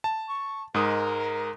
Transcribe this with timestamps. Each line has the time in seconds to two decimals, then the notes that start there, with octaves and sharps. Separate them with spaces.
0.04 A5
0.28 C#6
0.74 G#2 G#3 A#4 D#6